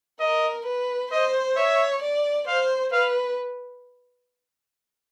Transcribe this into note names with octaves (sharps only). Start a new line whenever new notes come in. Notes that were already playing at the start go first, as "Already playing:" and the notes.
A#4 D#5
B4
C5 D#5
C#5 E5
D5
C5 F5
B4 F5